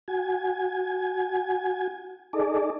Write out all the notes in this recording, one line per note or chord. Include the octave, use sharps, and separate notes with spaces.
F#4 G#5
D#4 G#4 A4 D5